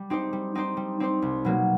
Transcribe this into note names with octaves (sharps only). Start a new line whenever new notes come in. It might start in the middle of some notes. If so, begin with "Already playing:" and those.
Already playing: G3
C4 D#4 G4 C5
G3
C4 D#4 G4 C5
G3
C4 D#4 G4 C5
C2
B2 F#3 A#3